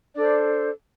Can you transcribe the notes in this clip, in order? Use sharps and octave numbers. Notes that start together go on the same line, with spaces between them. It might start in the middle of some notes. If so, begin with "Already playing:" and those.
D4 A4 C5 D5